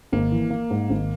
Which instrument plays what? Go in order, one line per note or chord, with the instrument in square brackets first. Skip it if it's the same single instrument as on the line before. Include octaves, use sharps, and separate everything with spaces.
[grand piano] G#1 [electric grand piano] A#3
[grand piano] E3
A#3
G#2
G#1